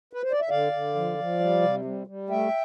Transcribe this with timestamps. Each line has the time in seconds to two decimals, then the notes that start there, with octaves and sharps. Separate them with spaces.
0.13 B4
0.23 C5
0.31 D5
0.41 E5
0.49 D3 D5 F5
0.73 D3
0.95 F3
1.18 F3
1.40 G3
1.62 C3
1.85 G3
2.07 G3
2.29 A3 E5 G5